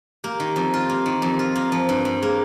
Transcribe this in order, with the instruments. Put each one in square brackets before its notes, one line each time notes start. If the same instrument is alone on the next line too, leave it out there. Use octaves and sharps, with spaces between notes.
[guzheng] A#3 [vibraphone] G4
[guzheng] D#3
F2
F4
A#3
D#3
F2
F4
A#3
F3
G2
G2
[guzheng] A#3 [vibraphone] G#4